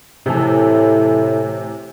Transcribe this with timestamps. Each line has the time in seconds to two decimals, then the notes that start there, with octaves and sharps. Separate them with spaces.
0.26 A2 C3 E3 A4